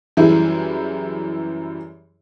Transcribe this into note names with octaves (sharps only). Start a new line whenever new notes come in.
F#2 E3 G3 E4 G#4